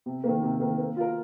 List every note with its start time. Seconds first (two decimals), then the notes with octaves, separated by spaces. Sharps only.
0.06 C3
0.24 D#3 A#3
0.43 C3
0.60 D#3 A#3
0.78 A#3
0.96 F4 A#4